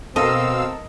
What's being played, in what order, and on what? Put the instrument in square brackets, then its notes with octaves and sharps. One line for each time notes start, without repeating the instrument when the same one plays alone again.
[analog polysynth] B2 F5 E6 [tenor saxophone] C4 [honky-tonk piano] A4 A#4 [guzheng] D#5